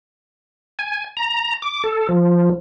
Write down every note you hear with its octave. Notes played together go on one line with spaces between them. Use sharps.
G#5
A#5
D6
A4
F3